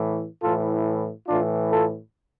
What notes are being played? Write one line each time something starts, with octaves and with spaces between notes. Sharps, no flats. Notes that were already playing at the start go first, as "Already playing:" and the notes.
Already playing: A2 E3
A2 E3 F4 A4
A2 E3 D4 F4
F4 A4